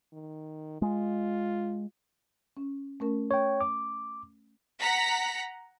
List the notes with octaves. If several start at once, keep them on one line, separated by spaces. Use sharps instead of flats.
D#3
G#3 F4
C#4
A3 C#4 A#4
C#5 G5
D6
F#5 A#5 B6